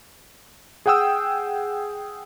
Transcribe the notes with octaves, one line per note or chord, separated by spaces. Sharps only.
G#4 F#5 G5 D#6 E6